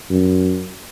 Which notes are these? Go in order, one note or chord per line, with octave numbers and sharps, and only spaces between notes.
F#2